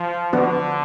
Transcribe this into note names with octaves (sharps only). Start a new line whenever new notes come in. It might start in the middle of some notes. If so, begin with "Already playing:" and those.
Already playing: F3
D3 F3 B3 D4 F#4